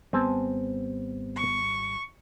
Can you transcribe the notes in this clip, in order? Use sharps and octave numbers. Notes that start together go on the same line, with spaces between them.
G#1 G3 B3 C4 G#5 A5
C#6